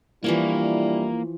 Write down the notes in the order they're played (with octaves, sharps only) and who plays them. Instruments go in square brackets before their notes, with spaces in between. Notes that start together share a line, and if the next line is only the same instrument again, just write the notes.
[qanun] E3 F3 C#5 [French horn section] G3 D4 E4 [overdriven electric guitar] A#3